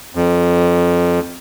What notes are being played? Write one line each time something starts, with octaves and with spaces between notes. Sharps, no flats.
F2